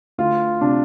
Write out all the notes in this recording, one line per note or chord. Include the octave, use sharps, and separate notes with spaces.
D2 F4
C3 D4